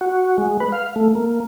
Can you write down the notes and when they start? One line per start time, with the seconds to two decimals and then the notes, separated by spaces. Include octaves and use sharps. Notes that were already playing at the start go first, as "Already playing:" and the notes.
0.01 F#4
0.38 G#3
0.60 B4
0.72 F5
0.96 A3
1.15 A#3